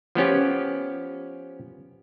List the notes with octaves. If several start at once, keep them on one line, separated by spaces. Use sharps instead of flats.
F3 B3 C#4 G4